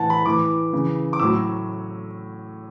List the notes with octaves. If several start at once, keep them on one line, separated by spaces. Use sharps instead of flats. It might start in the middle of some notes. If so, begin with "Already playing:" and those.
Already playing: A2 E3 F#5 A5
B5
A2 E3 D6
C#3 E3
D6
A2 F#3 E6